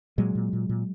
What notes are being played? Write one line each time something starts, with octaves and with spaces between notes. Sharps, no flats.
A#2 F#3 G#3
A#2
A#2
A#2